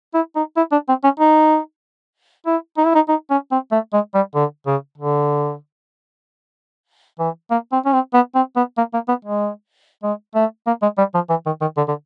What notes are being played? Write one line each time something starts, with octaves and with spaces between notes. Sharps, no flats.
E4
D#4
E4
D4
C4
C#4
D#4
E4
D#4
E4
D#4
D#4
C#4
C4
A3
G#3
G3
D3
C#3
D3
E3
A#3
C4
C#4
C4
B3
C4
B3
A#3
A#3
B3
G#3
G#3
A3
A#3
G#3
G3
F3
E3
D#3
D#3
D3
D3